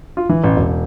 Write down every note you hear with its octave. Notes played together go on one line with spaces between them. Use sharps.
F4
E3
A1
E1